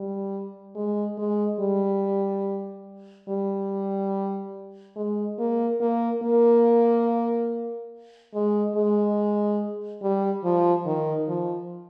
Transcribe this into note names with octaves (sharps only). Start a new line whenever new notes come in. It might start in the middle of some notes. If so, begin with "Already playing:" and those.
Already playing: G3
G#3
G#3
G3
G3
G#3
A#3
A#3
A#3
G#3
G#3
G3
F3
D#3
F3